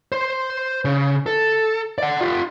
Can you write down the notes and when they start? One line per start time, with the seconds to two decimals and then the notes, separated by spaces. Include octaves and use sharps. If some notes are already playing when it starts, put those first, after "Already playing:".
0.12 C5 C6
0.85 C#3
1.26 A4
1.98 D5 F#5
2.21 F4 G4